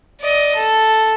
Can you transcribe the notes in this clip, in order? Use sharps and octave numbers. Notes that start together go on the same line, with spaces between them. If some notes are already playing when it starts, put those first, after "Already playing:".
D5 D#5
A4